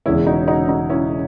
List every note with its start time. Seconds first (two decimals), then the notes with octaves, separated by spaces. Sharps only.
0.06 E1 E2 C#3 G#3 C#4 E4
0.26 D#4 F#4
0.48 D#4 F#4
0.69 D#4 F#4
0.89 C#4 E4